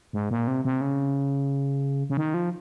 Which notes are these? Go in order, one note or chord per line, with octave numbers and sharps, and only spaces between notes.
G#2
A#2
C3
C3
C#3
C#3
D#3
F3